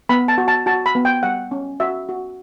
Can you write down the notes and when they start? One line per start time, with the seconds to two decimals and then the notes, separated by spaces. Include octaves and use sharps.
0.09 B3 B5
0.28 A5
0.38 F#4
0.48 A5
0.66 F#4 A5
0.86 B5
0.95 B3
1.05 G5
1.23 G3 F#5
1.51 C#4
1.80 F#4 E5
2.09 F#4